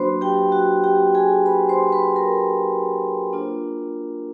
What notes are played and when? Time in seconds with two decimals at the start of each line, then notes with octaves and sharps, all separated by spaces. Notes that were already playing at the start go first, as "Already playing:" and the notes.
Already playing: F#3 A#3 D4 F#4 B4 C5 B5 C6
0.21 G4 G5
0.52 F#4 F#5
0.84 G4 G5
1.15 G#4 G#5
1.46 B4 B5
1.69 C5 C6
1.92 B4 B5
2.16 A#4 A#5
3.33 A#3 D4 F4